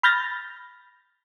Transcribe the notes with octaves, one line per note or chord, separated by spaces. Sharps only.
B5 F6 G6 A6 A#6